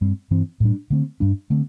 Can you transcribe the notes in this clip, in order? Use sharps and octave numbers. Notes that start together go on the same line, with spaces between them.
G2 G3 C4
G2 E3 C4
A2 G3 D4
D3 A3 C4
G2 G3 D4
D3 A3 C4